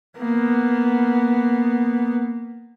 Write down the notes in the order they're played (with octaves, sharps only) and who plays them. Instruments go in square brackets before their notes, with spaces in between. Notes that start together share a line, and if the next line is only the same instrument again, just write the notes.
[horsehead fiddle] A#3 B3